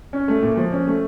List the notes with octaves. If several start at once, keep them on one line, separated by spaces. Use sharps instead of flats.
C#4
A3
A#2
F3
C#4
A3